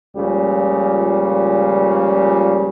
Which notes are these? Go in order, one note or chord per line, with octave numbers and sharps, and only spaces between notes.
C#2 A#2 C#3 F3 G3